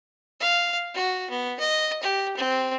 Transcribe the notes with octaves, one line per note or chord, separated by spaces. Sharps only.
F5
F#4
B3
D#5
G4
C4